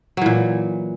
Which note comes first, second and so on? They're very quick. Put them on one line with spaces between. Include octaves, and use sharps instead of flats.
F#3 E3 A#2